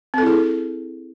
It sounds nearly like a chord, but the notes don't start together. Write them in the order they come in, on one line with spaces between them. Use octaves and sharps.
C4 A4 E4 G#4